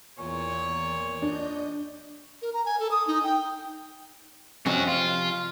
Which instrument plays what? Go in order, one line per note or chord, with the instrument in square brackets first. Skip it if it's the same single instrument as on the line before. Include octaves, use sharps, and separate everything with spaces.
[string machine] E2 [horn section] A#2 C#5
[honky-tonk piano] D4 [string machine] D#5 G6
[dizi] A#4
A#5
G#5
A4
D#6
D#4
G5
[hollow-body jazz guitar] F2 C3 [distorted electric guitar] C#4 F#4
[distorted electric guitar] F4